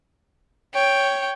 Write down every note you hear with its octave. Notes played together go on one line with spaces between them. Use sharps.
C#5 G5